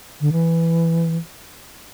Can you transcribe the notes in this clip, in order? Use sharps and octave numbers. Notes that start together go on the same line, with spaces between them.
D3
E3